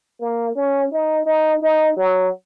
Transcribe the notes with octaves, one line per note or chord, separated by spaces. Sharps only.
A#3
C#4
D#4
D#4
D#4
F#3